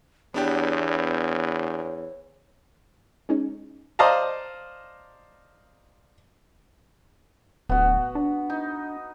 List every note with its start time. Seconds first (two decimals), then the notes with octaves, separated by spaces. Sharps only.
0.34 E2 B3 D4 G4 C#5
3.29 G#3 C#4 D#4
3.99 C5 D5 D#5 F5 A5 A#5
7.69 D1 B3 F#4
8.15 D4
8.50 D#4